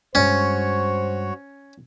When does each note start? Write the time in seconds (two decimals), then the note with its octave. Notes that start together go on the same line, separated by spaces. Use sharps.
0.15 G2 G#3 C#4 F#4 C5 C#5